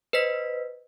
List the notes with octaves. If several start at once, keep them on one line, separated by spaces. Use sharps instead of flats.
B4 C5 D#5 B6